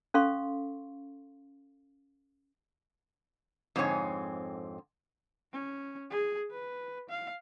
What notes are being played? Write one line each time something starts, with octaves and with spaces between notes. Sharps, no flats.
C#4 A4 F5 C6 C#6
F2 G#2 D3 C4 C#5 G#5
C#4
G#4
B4
F5